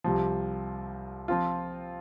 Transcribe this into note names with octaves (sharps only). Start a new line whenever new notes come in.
C2 C3 F3
F3 C4 F4